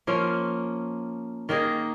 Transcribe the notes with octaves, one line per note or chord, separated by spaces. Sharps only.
F3 A#3 C#4 F4
D#3 A#3 D#4 G#4